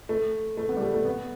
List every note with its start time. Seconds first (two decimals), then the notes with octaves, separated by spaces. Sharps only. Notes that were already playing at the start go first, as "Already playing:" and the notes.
0.09 A3
0.57 A3
0.69 B3
0.77 G3
0.82 A3
0.94 A3
1.05 B3